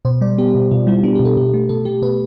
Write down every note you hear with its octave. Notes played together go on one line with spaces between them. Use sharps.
B2 C5
G3 D5
B3 G4
B2
B2 F4
G3 E4
B3 D4
B2 G4
A4
B2 G4
A3
B2 A4
A3 G4
B2 B4